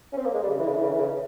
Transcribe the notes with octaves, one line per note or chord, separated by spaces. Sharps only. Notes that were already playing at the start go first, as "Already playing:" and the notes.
C#4
C4
A#3
G#3
G3
C#3
E3
C#3
E3
C#3
E3
C#3